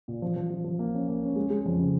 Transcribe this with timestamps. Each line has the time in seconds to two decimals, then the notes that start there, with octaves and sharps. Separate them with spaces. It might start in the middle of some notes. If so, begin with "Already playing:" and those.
0.08 A#2
0.22 F3
0.36 F3
0.50 F3
0.64 F3
0.79 A#3
0.94 C#4
1.08 A#3
1.23 C#4
1.36 G#3
1.50 G#3
1.66 F2
1.79 C#3